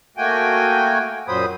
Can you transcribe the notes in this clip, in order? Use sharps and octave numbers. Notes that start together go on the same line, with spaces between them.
A3 A#3 F#4 G5 G#5
F#2 A#2 F#3 C5 B5 D#6